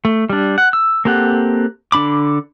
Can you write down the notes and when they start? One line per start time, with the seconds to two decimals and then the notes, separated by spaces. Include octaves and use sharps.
0.05 A3
0.30 G3 D4
0.58 F#5
0.73 E6
1.05 A#3 C4 G4 A4 F#5
1.92 D3 D4 B5 D6